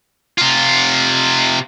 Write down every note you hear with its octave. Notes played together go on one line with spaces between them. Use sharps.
C3 F4